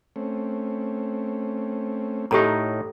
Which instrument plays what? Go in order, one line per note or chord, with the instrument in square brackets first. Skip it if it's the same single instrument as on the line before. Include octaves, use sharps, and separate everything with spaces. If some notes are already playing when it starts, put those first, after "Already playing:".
[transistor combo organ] A3 C4 C#4
[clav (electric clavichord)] A2 D#4 [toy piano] G4 A4 A#5